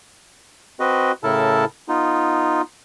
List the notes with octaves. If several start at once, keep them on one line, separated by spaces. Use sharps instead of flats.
C4 F#4 B4 D#5
A2 C#3 E4 A4 A#4 A5
B3 D#4 F4